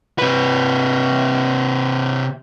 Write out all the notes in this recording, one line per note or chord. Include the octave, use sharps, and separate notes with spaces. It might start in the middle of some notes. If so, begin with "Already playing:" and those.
C3 B4